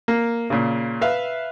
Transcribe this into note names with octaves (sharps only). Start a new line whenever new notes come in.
A#3
A#2 C#3
B4 E5 F5